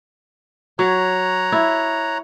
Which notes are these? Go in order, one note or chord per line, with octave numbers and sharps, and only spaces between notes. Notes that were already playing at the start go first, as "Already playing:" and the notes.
F#3 C#5 A#5 F#6
E4